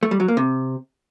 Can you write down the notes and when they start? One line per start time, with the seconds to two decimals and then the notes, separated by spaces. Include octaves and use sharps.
0.03 A3
0.11 G3
0.20 F#3
0.28 A#3
0.37 C3